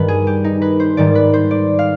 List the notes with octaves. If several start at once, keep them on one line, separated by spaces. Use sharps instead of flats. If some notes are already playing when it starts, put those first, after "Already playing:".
Already playing: G2 D#3 G3 B4
G#4
G4
D#4
B4
C5
G#2 D#3 G3 D5
B4
C5
D5
F5